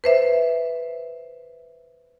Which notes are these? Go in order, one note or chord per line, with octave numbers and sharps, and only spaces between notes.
B4 C5 E5